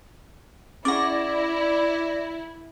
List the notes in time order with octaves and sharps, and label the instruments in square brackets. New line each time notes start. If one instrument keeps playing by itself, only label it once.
[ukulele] C#4 G#4 F#5 [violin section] E4 [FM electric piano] D5 A#6